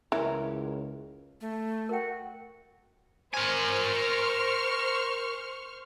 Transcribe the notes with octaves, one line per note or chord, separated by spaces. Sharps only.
C#2 E3 C#4 E4 A#4
A3
F#4 A#4 G5
A#4 C5 G#5 C#6 F6